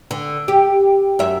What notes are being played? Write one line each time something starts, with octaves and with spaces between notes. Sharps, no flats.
D3
G4
F#2 E5